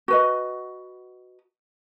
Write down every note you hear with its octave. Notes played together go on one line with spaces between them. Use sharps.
F#4 B4 D#5